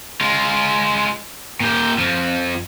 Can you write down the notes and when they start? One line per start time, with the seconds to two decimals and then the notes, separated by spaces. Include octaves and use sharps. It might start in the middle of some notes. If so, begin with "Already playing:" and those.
0.21 G#3 F4
1.60 A#2 G4
1.99 F2 F3